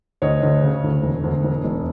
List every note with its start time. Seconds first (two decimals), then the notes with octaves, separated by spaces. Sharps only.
0.22 D2 C#5 D#5
0.43 D2
0.63 C#3
0.84 D2
1.03 E1
1.24 D2
1.44 E1
1.64 E1